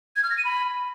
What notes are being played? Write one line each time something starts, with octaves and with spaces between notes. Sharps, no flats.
G#6
F6
A#6
D#7
B5